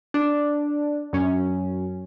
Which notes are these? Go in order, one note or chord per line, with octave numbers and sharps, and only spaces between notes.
D4
F#2 C#4